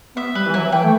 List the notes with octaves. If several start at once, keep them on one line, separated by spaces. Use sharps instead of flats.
B3 E5
G3 B4
E3
F#3 E4
E3 G5
A3